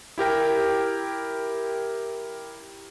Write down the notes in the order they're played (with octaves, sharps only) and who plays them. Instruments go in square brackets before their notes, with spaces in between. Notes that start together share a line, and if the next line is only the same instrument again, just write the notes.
[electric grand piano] E4 G4 A#4 G5